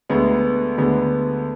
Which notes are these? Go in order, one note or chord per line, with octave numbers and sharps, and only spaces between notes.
D2 D3 G#3 B3
D2 D3 G#3 B3